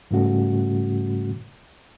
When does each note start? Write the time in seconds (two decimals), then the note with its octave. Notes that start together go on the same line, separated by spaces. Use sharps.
0.11 G#2 C#3 G3 A3 C#4 F#4